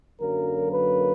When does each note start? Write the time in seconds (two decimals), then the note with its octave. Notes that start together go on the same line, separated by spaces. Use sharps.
0.21 F#2 D3 F#3 A#3 A#4
0.73 B4